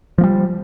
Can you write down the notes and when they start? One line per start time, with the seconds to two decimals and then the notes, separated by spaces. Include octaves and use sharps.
0.18 F3
0.21 A#3
0.24 G3